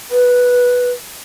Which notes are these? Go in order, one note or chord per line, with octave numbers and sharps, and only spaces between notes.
B4